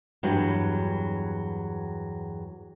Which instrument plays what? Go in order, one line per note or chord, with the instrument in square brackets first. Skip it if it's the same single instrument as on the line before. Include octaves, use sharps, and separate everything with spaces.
[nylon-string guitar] E2 G2 F#3